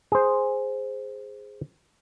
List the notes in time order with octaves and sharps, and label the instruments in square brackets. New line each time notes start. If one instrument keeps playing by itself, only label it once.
[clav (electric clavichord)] G#4 C5